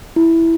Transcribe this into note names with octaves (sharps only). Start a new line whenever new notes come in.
E4